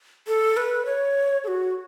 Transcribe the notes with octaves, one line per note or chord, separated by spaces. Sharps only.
A4
B4
C#5
A4
F#4